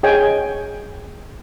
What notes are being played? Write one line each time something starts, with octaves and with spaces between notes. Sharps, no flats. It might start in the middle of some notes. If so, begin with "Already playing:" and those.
G#4 C#5 D#5 G5 G#5